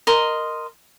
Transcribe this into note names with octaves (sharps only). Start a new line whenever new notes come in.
A#4 D#5 C6